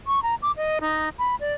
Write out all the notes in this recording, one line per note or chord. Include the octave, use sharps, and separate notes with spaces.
C#6
A#5
D6
D#5
D#4
B5
D5